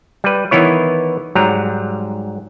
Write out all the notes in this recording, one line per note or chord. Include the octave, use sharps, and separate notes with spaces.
G3 B4
D#3 E3 B3 E4 C#5
G#2 F#3 G3 A#5